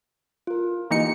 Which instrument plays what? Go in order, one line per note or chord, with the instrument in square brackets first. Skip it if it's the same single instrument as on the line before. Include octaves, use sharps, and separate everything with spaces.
[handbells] F4 A#4
[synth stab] E3 D#4 C#7 [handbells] A#3 G4